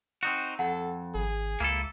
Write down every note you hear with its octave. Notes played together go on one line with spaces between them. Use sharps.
C4 D#4 F#4
F2 A4 F#5 A#5
G#1 G#4
C#2 A#3 E4 A4